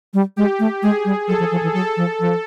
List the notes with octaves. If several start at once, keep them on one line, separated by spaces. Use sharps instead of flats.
G3
G#3 G4
A3
G#3 G#4
G3
F#3 A4
F3
F3
E3
F#3 A4
F3
F3